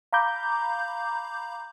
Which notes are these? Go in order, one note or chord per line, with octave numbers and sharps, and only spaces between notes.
F5 A#5 B5 D6 G6